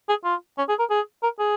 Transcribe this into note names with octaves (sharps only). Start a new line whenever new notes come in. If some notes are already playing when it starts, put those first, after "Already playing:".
G#4
F4
C#4
G#4
A#4
G#4
A#4
G#4